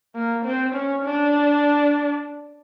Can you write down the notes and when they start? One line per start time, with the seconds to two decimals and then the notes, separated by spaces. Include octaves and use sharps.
0.15 A#3
0.46 C4
0.75 C#4
1.04 D4